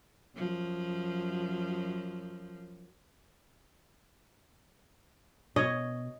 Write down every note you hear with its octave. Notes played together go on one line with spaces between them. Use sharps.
F#2 F3
B2 C#5 D#5